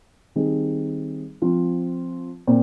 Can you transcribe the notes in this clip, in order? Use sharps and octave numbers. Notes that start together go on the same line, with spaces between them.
D#3 G3 C4 D#4 G#4
F3 C4 F4
A#2 C4